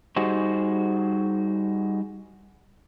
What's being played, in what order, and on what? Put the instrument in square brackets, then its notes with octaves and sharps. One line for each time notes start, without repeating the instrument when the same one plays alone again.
[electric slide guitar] G3 D#4 F#4 G#4 C5